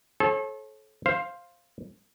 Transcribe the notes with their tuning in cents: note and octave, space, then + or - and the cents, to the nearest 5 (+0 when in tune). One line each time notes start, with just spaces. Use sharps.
A4 -30 C#5 -40
C5 +10 F5 +0